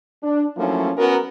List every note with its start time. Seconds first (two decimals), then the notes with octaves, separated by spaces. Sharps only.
0.23 D4
0.57 F3 F#3 A3 A#3 C#4 E4
0.98 B3 C#4 F#4 A#4